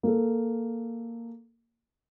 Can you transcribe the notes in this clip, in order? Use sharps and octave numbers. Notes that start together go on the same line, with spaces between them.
A#3 A4